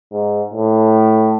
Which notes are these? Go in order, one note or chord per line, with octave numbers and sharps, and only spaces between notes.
G#2
A2